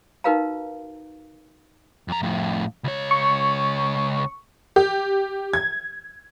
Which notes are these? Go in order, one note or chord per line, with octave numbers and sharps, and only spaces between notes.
D#4 F#4 A#4 B4 F5 A#5
F2 A#5
F2 A2
C#2 C#5
C#6
G4
G#6